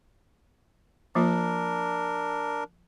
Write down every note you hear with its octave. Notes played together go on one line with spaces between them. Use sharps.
F3 A#3 D4 F4 A#4